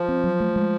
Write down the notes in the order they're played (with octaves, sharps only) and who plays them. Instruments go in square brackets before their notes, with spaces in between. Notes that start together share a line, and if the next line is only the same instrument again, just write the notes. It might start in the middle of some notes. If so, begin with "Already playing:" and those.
Already playing: [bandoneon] F3
[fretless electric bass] C4
F#3
A3
G#3